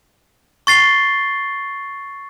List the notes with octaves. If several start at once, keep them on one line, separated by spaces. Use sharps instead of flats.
C#6 A6 C7 G7